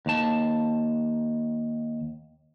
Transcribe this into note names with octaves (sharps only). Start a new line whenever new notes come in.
D#2 A5